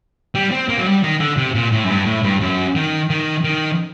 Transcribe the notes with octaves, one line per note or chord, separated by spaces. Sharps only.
G3
C4
A#3
F#3
G3
D#3
D3
C3
A#2
A2
F#2
G2
A2
G2
F#2
D#3
D#3
D#3